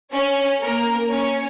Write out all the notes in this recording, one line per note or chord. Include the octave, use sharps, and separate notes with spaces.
C#4 C#5
A#3 A#4
C#4 C#5